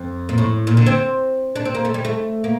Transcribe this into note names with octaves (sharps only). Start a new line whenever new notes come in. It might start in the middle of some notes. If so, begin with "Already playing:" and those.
Already playing: F2
A#2
A2
A#2
D3
C4
D4
C4
A#3
A3
G3
A3
A#3